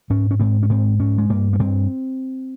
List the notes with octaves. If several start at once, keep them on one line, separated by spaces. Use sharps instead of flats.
G#2 C#4
C#4
G#2 C4
C#4
G#2 C4
G#2 C#4
G#3
G2 A#3
A#3
G2 C4